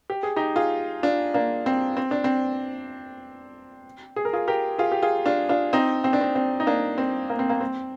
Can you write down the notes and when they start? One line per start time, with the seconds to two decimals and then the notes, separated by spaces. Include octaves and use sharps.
0.10 G4
0.23 G#4
0.36 D#4 G4
0.56 F4 G#4
1.03 D4 F4
1.34 A#3 D4
1.66 C4
1.97 C4
2.11 D4
2.24 C4
4.16 G#4
4.25 A#4
4.33 F4 G#4
4.48 G4 A#4
4.79 F4 G#4
4.92 G4
5.02 F4 G#4
5.26 D4 F4
5.49 D4 F4
5.73 C4 D#4
6.04 C4
6.13 D4
6.21 C4
6.35 C4
6.60 D#4
6.67 A#3 D4
6.98 C4
7.30 A#3
7.39 C4
7.49 A#3
7.61 C4